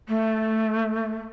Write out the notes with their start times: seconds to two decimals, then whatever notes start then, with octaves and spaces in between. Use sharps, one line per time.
0.09 A3